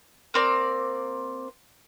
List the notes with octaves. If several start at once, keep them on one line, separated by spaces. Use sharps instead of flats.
A#3 C4 D5